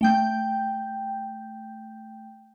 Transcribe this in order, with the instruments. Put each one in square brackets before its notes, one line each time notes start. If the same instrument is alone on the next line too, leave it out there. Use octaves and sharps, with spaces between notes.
[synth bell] A3 G5 G6